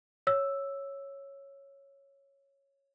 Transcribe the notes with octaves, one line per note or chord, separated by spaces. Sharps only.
C#5 E6